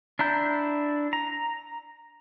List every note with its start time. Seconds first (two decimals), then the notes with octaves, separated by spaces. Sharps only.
0.19 D4 E4 A#5 G6
1.13 A#5